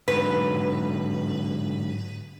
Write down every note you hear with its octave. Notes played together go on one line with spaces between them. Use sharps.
G#2 D3 F#3 B4